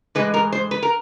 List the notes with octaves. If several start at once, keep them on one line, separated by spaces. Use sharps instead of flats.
A2 E3 G#3 B4
A#4
C5
B4
A#4